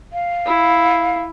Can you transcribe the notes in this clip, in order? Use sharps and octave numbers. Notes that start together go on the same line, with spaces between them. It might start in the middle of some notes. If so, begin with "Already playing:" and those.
F5
E4